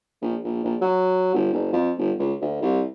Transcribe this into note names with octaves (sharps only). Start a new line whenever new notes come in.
A#1
A#1
A#1
F#3
G1
F#1
F2
G1
C#2
D2
C2